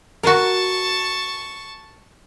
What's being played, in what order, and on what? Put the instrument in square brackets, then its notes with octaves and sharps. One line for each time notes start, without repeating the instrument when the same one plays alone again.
[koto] F#4 A#4 [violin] A5 C#6